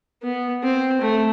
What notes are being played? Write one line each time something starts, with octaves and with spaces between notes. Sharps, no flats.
B3
C4
A3